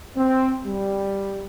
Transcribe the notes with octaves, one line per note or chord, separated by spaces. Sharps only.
C4
G3